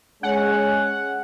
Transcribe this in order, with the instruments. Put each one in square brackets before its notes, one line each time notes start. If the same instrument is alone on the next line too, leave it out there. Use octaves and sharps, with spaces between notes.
[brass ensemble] G#3 C#4 [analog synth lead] F#5